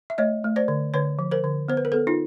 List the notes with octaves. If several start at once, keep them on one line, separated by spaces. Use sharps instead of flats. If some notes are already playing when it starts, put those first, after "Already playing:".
E5
A3 C#5 D#5
A3
C5 D5
D3
D3 B4 C#5
F3
A#4 C5
D3
B3 C5
B4
A#4
B3 A4 B4
D#4 F4